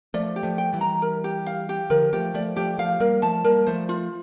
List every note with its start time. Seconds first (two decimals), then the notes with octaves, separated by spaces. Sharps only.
0.14 F3 A3 D5
0.36 G4
0.43 F3 A3
0.58 G5
0.73 E3 G3
0.81 A#5
1.02 A#4
1.24 G4
1.46 F5
1.69 G4
1.90 D3 F3 A#4
2.13 F3 A3 G4
2.34 F3 A3 D5
2.56 F3 A3 G4
2.78 F3 A3 F5
3.00 G3 A#3 A#4
3.22 F3 A3 A5
3.44 G3 A#3 A#4
3.66 F3 A3 C5
3.89 F4